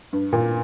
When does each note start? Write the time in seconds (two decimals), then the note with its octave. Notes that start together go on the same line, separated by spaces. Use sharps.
0.13 G2
0.33 A#2